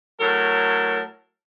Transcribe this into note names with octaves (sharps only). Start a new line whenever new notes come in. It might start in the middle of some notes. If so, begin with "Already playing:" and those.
A2 F#3 A4 A#4 A5